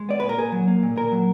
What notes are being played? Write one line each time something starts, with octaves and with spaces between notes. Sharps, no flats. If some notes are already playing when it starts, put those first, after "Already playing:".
Already playing: G#3
B3 D5
A#2 B4
A#4
A#2 G#4
F#3
A#3
A#2
A#2 A#4
F#3